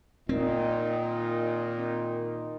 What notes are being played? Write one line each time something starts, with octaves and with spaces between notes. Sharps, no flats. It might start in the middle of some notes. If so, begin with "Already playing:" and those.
A#2 D#3 C4 D#4